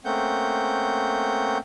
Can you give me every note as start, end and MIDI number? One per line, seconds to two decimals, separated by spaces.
0.05 1.58 57
0.05 1.58 58
0.05 1.58 60
0.05 1.58 61
0.05 1.58 78
0.05 1.58 91